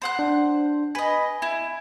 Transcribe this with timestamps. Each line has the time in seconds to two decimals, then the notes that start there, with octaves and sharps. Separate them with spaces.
0.02 C5 F#5 F#6
0.19 D4
0.95 B4 D#5 G#5
1.42 E4